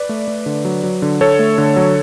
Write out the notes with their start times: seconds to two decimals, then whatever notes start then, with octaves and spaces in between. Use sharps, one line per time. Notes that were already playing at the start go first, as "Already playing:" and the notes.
Already playing: B4 D5
0.09 A3
0.28 A3
0.46 D3
0.65 F#3
0.83 F#3
1.02 D3
1.21 D3 A4 C#5
1.39 A3
1.58 D3
1.76 F#3